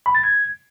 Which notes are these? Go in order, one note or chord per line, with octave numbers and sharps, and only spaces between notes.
B5
A6
G#6